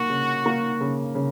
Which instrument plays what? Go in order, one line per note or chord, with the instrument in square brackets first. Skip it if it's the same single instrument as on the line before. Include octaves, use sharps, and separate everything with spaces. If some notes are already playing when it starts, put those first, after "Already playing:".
Already playing: [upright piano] A#3 [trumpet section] F#4
[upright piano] C#3
A#3
C#3
C#3